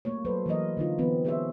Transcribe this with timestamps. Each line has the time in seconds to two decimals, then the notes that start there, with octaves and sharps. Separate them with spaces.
0.05 G3 A3 A#3 C#5
0.25 F#3 A4 B4 C5
0.46 E3 F#3 A#3 A#4 D#5
0.77 D3 D#4 F4
0.98 E3 B3 C4 B4
1.25 G4 G#4 C5 C#5 E5